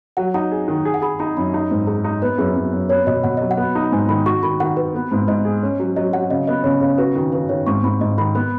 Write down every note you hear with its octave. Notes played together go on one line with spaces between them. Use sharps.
F#3 F#5
D#4 F#5
G#4
D#3
G#4
F#5
G#4 B5
D#4 B5
F#2 B5
D#4
G#2
D#4 G#4
D#4
B3 B4
F#2 G#4
F#2
F#2
B3 C#5
B2 D#5
B2 F#5
F#3 D#5
F#5
B3
D#4
G#2 G#5
D#3 B5
F#4 C#6
D#3 B5
D#3 F#5
F#4 B4
B3
G#2
G#2 D#5
G#4
C#4
F#3
F#3 D#5
F#3 F#5
C#3 D#5
B3 D#5
C#3 C#5
C#3
F#4 B4
D#3
D#3 B4
D#3 C#5
G#2 C#6
G#2 B5
G#2 D#5
D#3 B5
B3 B5